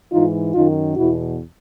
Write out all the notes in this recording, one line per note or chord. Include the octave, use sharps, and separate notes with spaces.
G#2 E3 D#4 F4
F#2 D#3 D#4 F4
E2 B2 E4 F#4